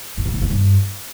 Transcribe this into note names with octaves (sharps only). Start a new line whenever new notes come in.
A2
A#2
D3
C3
G2